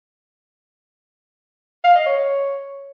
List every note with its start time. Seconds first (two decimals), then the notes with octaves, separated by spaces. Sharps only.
1.85 F5
1.95 D#5
2.06 C#5